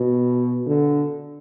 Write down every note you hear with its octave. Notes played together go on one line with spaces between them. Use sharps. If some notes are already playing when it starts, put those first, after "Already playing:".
Already playing: B2
D3